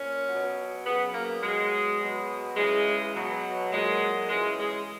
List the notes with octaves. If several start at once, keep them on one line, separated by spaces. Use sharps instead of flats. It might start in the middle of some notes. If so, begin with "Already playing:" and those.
Already playing: A#2 C#4
B2 F#3
C#3 F#3 B3
A#3
B2 F#3 G#3
B2 F#3
C#3 E3 G#3
B2 F#3
A#2 F#3 G#3
C#3 E3 G#3
G#3